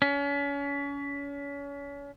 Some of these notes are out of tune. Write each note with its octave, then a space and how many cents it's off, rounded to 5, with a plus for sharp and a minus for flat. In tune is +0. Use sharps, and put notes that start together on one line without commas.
C#4 +35